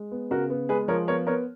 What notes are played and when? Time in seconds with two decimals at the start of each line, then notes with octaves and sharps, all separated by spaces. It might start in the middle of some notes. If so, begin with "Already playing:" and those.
Already playing: G#3
0.11 B3
0.31 C#3 F#4 A#4
0.50 B3
0.69 G#3 G#4 B4
0.88 F3 A#4 C#5
1.08 B3 A#4 C#5
1.27 B3 A#4 C#5